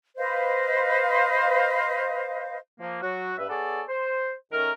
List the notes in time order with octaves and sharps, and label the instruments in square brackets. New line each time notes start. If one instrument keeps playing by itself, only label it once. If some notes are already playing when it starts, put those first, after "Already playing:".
[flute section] B4 C5 D#5 F5
[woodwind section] F3 A#3
F#3 F#4
G2 B4 E5
B3 G#4 A4 C#5 D5
C5
D#3 A3 C#4 A#4